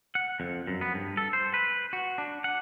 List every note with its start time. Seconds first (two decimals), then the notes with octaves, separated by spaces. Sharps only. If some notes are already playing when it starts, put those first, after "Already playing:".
0.15 F#5
0.40 F2
0.67 F#2
0.81 B3
0.94 G2
1.17 A4
1.33 C5
1.54 B4
1.93 F#4
2.18 D4
2.44 F#5